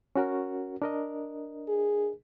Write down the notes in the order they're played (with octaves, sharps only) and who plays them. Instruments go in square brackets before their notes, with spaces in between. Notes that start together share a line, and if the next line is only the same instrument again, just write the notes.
[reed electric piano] C#4 F#4 A#4
D4 A#4 D#5
[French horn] G#4